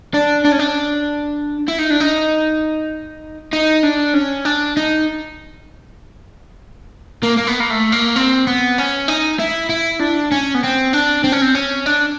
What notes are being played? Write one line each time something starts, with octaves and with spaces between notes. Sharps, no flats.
D4
D4
C#4
D4
E4
D#4
D4
D#4
D#4
D4
C#4
D4
D#4
A#3
A#3
B3
A#3
A3
A#3
C4
B3
C#4
D#4
E4
E4
D4
C#4
B3
C4
D4
C4
C#4
C4
C#4
D4